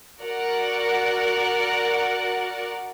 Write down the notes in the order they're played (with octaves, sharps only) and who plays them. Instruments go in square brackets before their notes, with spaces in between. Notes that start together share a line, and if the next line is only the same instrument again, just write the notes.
[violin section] F#4 A#4 D5 F#5